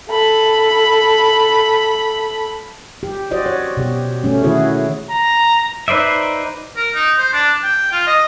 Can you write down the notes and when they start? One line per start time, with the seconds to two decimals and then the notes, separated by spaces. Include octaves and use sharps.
0.10 A4 B5
3.03 G4
3.31 F#4 C5 D5 D#5
3.46 C#5
3.77 B2 G4
4.24 A3 C#4
4.42 D#3 E4 F#4 G#4 C#5
5.11 A#5
5.88 D#4 B4 C5 D5 E5
6.77 A#4
6.95 D#4
7.18 C5
7.33 D4
7.64 G5
7.93 F4
8.07 D#5